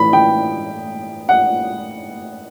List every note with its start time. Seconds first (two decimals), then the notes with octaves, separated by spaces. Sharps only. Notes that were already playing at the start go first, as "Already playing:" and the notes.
Already playing: A2 E3 B5
0.13 G5
1.29 F#5